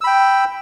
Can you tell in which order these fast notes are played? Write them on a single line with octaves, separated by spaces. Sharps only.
E6 B5 G5